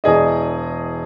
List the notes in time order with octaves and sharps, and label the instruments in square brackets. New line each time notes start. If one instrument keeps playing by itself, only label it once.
[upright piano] E1 E3 G#4 D5 D#5